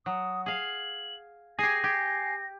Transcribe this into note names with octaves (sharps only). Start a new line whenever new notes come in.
F#3 D#6
G#4 F5 F#7
G4 G#4 G#5 A#6 C7
G4